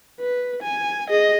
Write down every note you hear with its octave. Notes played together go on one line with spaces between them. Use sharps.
B4
G#5
G#4 D#5